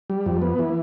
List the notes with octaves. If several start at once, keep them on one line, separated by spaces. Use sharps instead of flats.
G3
F2
B3
E3